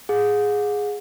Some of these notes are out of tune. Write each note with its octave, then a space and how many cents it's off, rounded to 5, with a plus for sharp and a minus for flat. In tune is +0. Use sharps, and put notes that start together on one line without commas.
G#4 +0 F#5 -40